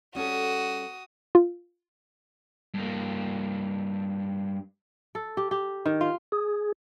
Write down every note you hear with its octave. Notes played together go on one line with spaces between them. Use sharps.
G3 C#4 F#4 A4 D#6
F4
G2 A#3
A4
G4
G4
D#3
F4
G#4